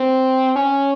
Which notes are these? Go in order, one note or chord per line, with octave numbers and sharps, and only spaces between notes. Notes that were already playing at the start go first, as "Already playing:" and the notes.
Already playing: C4
C#4